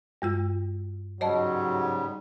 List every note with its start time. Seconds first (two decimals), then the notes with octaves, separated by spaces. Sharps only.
0.22 G2 G#3 F4
1.21 G#2 C#3 F#3 G3 C#5 D#5 A5